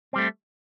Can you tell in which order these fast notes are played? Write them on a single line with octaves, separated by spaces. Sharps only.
C4 G3 A3